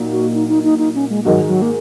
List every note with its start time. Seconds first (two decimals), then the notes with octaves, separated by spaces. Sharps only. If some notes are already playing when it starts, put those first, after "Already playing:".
Already playing: A#2 F#3 D#4
0.11 F#4
0.34 D#4
0.48 D#4
0.64 D#4
0.79 D#4
0.95 C#4
1.10 G#3
1.25 G#2 D#3 F#3 G#3 D#4 F#4
1.47 F#3
1.62 A#3